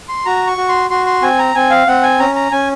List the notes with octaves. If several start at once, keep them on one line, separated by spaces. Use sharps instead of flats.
C6
F#4 A#5
C#6
F#4
C6
F#4 C6
C6
C4 G#5
A#5
C4 G#5
F5
C4 F#5
G#5
C#4 A#5
A#5
C#4 G#5